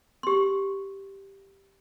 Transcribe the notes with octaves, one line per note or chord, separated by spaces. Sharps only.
G4 C6